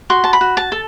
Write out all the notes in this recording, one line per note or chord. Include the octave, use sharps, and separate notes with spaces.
F#4 C6
A5
B5
F#4
A5
A4